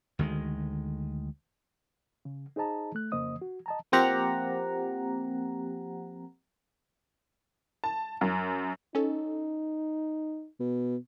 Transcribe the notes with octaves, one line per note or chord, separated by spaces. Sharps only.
D2 D#3 G#3
C#3
D#4 G#4 C5 D#5 A5 A#5
A3 F#6
F2 C#3 A#3 C5 D#5 D#6
F#4
D#5 A5 A#5
F3 A#3 C4 G4 F#5 A#5
A5
F#2
C#4 D#4 A4
B2